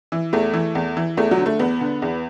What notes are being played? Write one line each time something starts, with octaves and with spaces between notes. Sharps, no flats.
E3
E2 A3
E3
E2
E3
E2 A3
F#3
D3
A3
E2 B3
D3
E2